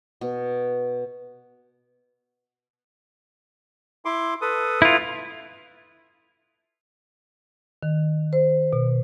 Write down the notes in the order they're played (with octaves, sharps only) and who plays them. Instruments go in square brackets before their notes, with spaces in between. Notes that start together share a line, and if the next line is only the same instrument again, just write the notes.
[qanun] B2
[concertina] E4 C6 D6
A4 B4 D#6
[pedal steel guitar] E4 F4
[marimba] D#3
C5
B2